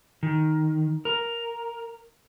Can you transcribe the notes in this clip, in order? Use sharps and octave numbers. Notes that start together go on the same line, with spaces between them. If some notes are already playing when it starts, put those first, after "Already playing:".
D#3
A#4